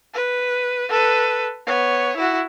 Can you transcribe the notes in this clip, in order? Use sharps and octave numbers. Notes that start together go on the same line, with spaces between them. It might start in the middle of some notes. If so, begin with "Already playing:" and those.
B4
A4 B4
B3 C#5
E4 F#4